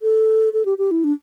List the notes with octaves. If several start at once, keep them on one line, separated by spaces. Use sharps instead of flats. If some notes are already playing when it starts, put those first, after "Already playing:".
A4
A4
G4
G4
E4
D4